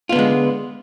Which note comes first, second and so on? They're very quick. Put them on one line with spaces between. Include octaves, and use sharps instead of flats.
F4 B3 D3 G#3